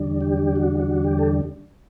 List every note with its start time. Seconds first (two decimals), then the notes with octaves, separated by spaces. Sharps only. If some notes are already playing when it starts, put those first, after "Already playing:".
Already playing: E2 D3 G3 D4
0.21 G4
0.56 F#4
0.80 F#4
1.04 G4
1.19 A4